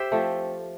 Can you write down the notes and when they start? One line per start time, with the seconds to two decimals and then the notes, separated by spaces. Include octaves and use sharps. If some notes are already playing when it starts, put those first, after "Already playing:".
Already playing: G4 C5 E5
0.12 F3 A3 C4